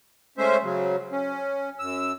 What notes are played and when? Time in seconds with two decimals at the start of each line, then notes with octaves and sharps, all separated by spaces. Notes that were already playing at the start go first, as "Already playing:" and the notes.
0.38 G#3 A3 C#4 C5 E5
0.63 C#3 F#3
1.12 C#4
1.79 F#2 E6